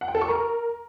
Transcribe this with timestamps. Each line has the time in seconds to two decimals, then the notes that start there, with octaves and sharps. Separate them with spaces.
0.01 F#5
0.08 G5
0.15 A4
0.21 C#6
0.28 A#4